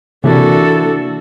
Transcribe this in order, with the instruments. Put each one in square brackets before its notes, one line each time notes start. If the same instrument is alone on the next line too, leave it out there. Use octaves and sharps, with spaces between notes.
[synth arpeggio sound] C3 [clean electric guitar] E3 A#3 E4 [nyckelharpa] D4 F#4 [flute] A4